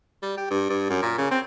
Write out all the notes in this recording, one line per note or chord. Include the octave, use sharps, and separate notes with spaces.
G3
G4
G2
G2
F#2
A#2
C#3
C4